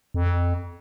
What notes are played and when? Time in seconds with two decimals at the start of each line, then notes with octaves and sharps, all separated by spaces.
0.14 F2